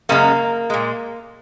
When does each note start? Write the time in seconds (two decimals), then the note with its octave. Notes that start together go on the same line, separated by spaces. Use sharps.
0.09 F#2 C#3 G#3 A#3
0.70 A#2 G#3